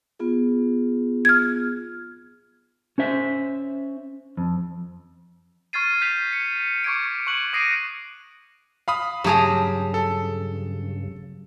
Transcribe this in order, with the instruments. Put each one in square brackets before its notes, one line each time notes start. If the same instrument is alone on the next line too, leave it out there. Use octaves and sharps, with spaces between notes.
[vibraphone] B3 F4 G#4
[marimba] F6 G#6
[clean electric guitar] C#4 C5 E5
F2
[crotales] C#6 F6 G#6 A6 C7 D#7
G6 B6 C7 F7
C#7
C#6 D6 G#6 C#7 D7
C#6 F#6 F#7
D6 D#6 A#6 C7 D7 D#7
[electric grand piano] F5 B5 D#6
[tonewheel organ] G2 C#3 [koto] F#3 G#4 A#5 [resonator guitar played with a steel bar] G4 A5
[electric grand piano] A4